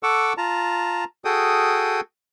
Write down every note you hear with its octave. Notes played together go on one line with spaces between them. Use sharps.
A4 F#5 C#6 D6 E6
F4 A5 A#5
F#4 G#4 A4 G5 D#6